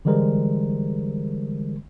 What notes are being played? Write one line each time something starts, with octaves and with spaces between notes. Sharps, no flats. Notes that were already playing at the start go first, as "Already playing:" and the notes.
D3 E3 G3 G#3 A#4 C5